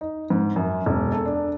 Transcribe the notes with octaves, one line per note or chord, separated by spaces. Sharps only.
D#4
G#2
F#2
E1
A4
D4